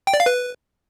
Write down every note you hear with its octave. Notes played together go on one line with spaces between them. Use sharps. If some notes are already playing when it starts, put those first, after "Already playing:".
G5
D5
F5
B4